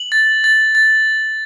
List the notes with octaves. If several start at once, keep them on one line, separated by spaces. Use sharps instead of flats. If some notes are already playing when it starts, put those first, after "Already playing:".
Already playing: F#7
A6
A6
A6